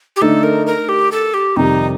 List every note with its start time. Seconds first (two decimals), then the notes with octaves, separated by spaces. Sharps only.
0.16 G4
0.21 D3 A3 D#4 A4
0.43 A#4
0.67 A#4
0.89 G4
1.12 A4
1.34 G4
1.56 F2 C3 D#3 G3 D#4